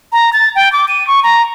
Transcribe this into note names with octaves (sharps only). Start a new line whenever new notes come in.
A#5
A6
G5
D6
D#7
C#6
A#5